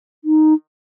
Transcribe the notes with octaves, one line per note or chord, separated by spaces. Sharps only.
D#4